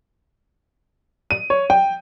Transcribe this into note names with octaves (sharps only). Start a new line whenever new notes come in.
D#7
C#5
G5